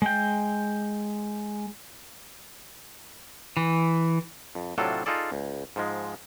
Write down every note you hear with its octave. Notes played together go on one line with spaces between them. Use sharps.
G#3 G5
E3
F2
A2 C3 F#3 D4 F4 A4
D#4 F4 G#4 A4 D5
C#2
G#2 F3 G#3